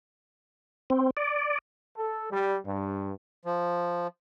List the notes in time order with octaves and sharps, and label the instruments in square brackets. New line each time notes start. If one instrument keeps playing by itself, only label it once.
[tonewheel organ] C4
D5
[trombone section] A4
G3
G2
[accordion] F3